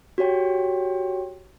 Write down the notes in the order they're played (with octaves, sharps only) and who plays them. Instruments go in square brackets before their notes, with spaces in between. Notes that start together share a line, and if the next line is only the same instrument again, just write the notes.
[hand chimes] F#4 G4 C#5 G5